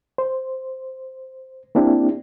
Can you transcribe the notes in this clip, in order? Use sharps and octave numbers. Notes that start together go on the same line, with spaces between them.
C5
A#3 C4 D4 E4 G4